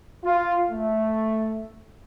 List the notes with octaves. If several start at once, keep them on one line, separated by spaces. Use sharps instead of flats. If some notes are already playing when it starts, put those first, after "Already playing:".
F4
A3